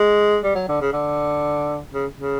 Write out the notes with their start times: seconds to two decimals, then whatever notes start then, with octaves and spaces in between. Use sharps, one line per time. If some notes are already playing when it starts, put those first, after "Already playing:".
Already playing: G#3
0.43 G3
0.55 F#3
0.68 D3
0.81 C#3
0.93 D3
1.93 C#3
2.17 C#3